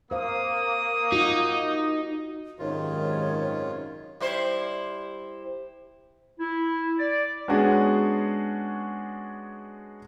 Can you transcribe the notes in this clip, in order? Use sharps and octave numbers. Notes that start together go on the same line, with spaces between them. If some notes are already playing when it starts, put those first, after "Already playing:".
A#3 C5 F5 D#6
D#4 F4 F#4
G#1 F#2 C3 D#3 F4 C#5
G3 E4 C5
E4
D5
G#3 B3 C#4 D4 F#4 G#4